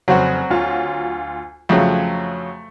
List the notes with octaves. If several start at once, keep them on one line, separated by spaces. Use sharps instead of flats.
F1 C#3 F#3 C4 F#4
D2 F4
F2 C#3 F#3 A3